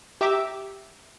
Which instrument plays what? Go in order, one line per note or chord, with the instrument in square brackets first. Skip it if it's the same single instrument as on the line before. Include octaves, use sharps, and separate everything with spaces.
[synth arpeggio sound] G4 E5 A#5 D6 E6